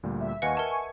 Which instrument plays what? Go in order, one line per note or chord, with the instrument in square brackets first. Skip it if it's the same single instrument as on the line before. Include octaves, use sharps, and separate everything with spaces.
[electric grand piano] D2 A#2 G3
[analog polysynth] E5
[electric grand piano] D#2 F5 C#7 [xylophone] B4 D#5 F#5 [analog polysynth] G#5 C#6
[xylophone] A#4 A5 [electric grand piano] E5